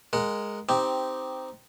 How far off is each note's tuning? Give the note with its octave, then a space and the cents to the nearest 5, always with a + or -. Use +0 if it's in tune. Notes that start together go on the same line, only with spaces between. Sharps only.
G#3 +0 A#4 +0 F#5 +0
C4 -10 D#4 +0 G4 +0